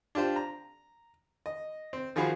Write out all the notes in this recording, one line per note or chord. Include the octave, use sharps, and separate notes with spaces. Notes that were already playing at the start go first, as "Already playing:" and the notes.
D4 F4 G4 C5
A#5
D#5
C4
D#3 F3 F#4 G#4 F5 B5